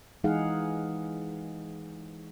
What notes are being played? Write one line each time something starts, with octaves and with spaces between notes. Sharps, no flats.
E3 G#3 D#4 G#4 F5 F#5